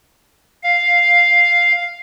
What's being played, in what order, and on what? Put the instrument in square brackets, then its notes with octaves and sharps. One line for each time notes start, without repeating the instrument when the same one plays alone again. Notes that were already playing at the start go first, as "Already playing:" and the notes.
[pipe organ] F5